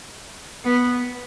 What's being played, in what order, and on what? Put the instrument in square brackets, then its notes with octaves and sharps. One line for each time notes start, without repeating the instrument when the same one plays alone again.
[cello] B3